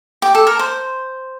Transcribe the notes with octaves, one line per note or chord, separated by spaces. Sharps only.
G4
A4
A#4
C5